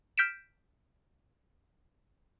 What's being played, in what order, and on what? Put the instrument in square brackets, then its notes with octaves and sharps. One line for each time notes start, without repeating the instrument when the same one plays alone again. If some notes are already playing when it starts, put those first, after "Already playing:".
[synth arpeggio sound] F6 G6 B6 D7 E7